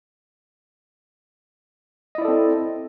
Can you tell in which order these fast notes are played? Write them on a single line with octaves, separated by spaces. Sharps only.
D#5 E4 D5 A4 C4